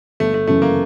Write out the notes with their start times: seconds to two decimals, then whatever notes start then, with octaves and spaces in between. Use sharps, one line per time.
0.20 G1 A3
0.34 A3
0.47 F#2 C#3 E3 A3
0.62 A#3